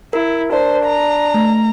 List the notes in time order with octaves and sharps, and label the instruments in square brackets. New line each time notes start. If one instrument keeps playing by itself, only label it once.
[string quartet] E4 [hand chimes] A#4
[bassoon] D4 [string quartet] C5
[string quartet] A#5
[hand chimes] A3